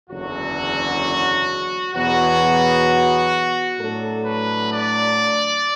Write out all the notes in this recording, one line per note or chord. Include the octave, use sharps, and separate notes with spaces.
F#1 E2 D3 F#3 F#4
E2 B2 F#3 B3 F#4
A2 F#3 D4 A4
B4
D5